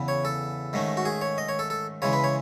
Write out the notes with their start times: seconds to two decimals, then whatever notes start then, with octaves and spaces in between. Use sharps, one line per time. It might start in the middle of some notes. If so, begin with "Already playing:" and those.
Already playing: E2 C#3 E3 B3
0.08 C#5
0.25 A4
0.73 G#2 D#3 A3 C#4
0.97 F#4
1.05 G#4
1.22 C#5
1.38 D#5
1.49 C#5
1.59 A4
1.70 A4
2.02 C#3 E3 G#3 C#5
2.13 B4
2.24 C#5